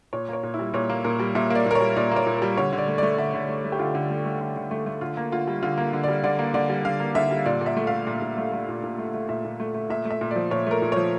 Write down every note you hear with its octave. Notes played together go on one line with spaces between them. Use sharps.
A#2 C#5
A#3 C#5
A#2
E4
G3
A#2 C#5
A#3
A#2 A#4
G3
A#2 E5
A#3 D5
A#2 A#4
C#5
G3
A#2 D5
A#3 C#5
A#2
G3 A#4
D3 C#5
D3
D5
A3
A3 D5
D3 E5
D3
A3
A3
G4
D3 F4
D3
A3
A3
D3
D3
A3
A3
D3 F4
A#3
D3 F4
G3
D3 F4
A#3
D3
G3 D5
D3 D5
A#3
D3 D5
G3
D3 F5
A#3
D3 E5
G3
A#2 D5
A#2
E5
A3
A3 F5
A#2
A#2
A3
A3
A#2
A#2
A3
A3
A#2 E5
A#2
A3
A3
A#2 E5
A3
E5
A#2
F3 D5
A#2 C#5
A3 A#4
A#2
F3 C#5